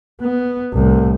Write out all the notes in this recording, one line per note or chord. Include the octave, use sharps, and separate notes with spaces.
B3
C2 A2